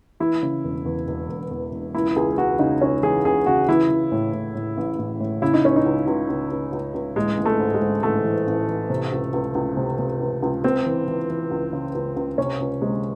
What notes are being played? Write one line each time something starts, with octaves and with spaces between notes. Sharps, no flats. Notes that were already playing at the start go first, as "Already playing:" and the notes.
E3 E4
C#3
E1
E2
E1
E1
E2
E1
C#2 E4
C#2 G#4
C#2 F#4
C#3 D#4
C#2 C#4
E3 G#4
C#2 G#4
C#3 F#4
E3 E4
E3
A2
A2
A2
A1
A1
A2
C#3 E4
D#4
C#2 C#4
D#4
C#2
C#2
C#2
C#2
C#2
C#2
A1 G#3
A1
A3
G#2
G#3
G#2
A1 A3
E3
A1
E3
C3
C#2
C#2
C#2
C3
C3
C#2
C#2
C#2 C4
E3
E3
E3
C#2
C#3
C#2
C#2
C3 C#4
C#2
C3 G#3